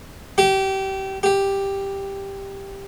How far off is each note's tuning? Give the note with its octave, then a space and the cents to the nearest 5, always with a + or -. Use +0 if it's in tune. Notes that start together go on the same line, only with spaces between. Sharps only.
G4 -25
G4 +5